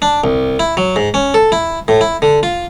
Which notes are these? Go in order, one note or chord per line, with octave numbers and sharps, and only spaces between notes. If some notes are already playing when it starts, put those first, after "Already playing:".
D4
C2
E4
F#3
G#2
C#4
A4
E4
A2
E4
D3
F4